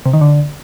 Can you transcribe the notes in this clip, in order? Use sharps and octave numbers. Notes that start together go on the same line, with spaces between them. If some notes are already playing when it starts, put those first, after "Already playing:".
C3
D#3
D3